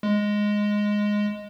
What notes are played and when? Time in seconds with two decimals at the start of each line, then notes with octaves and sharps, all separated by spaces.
0.03 G#3